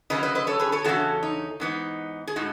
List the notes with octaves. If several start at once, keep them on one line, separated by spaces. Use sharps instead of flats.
C#3 F#3 C#4 B4 D#5
B4 D#5
B4 D#5
A4 C#5
G#4 B4
A4 C#5
E2 C#3 F#3 C#4 F#4 A4
D#4
G#2 E3 B3 D#4
G#4
A2 G#3 D#4 F#4